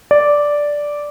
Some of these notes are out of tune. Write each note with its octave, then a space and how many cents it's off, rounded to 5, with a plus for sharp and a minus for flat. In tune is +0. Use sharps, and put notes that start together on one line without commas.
D5 -5